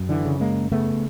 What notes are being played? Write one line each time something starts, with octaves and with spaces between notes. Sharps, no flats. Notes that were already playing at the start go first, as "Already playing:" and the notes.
Already playing: F#2
D3 E3
C#3
G#3 A#3
C#3 A3 B3